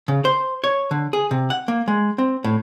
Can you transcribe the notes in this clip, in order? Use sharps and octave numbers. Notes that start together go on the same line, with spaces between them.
C#3
C5
C#5
D3
G#4
C3
F#5
A#3
G#3
C4
A2